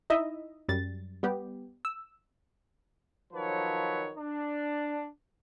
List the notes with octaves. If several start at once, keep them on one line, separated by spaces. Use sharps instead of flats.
D#4 E4 D#5 E5
F#2 G3 A6
G3 B3 G4
E6
D#3 F3 F#3 B4 C#5
D4